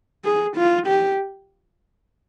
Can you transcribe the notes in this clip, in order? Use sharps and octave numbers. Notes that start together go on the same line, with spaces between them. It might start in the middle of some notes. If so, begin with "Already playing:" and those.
G#4
F4
G4